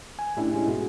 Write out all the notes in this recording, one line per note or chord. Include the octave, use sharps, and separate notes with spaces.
G#5
A2 A3 C#4 D4 E4 G4
G#3 C#4 E4
G#2 B2 F#4 G#4